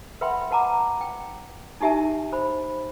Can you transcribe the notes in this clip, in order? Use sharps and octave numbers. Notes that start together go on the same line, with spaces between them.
B4 E5 F#5 G5 B5 C6
B4 F#5 A5 A#5 D6
G5
D#4 E4 G4 E5 G#5 A5
C5 B5